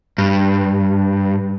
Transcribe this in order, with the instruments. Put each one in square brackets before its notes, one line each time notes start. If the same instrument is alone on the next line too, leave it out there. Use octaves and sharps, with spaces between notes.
[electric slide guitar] G2